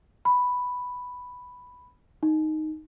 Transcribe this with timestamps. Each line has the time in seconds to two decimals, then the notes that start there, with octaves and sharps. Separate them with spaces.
0.25 B5
2.23 D#4